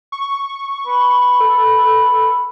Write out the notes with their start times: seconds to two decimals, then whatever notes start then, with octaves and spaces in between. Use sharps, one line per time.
0.12 C#6
0.86 B4
1.40 A4